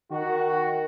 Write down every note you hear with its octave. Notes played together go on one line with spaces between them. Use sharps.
D#3 F#4